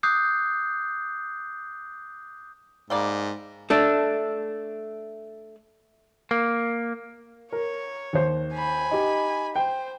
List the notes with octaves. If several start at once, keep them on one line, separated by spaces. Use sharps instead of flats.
D6 D#6 F#6 G6 C7
G#2 G3 A#3 D5
A3 D4
A#3
A#4 C#5
D#2 C5
G#5 B5
D#4 G4
C5 G5